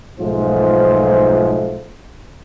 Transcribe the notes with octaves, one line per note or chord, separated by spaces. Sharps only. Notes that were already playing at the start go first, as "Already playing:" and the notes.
B1 G#2 F3 A3 F4 C5